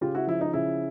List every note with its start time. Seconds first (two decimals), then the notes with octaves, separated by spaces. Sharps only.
0.01 C#3 F4 G4
0.15 E4 F#4
0.27 F3 E4
0.41 D#4
0.53 C#3 E4